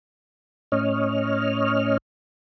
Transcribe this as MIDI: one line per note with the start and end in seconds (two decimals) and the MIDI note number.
0.72 1.97 45
0.72 1.97 61
0.72 1.97 73
0.72 1.97 75
0.72 1.97 89